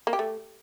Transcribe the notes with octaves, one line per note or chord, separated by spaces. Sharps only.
A#3
G4
A3